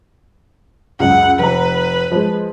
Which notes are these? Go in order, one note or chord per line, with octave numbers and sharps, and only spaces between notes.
C#2 F#2 F#5
F1 B4 A#5
F3 G#3